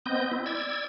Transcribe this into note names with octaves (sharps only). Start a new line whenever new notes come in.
B3 C4 D#5 G6
C4 E4
D5 E6 G#6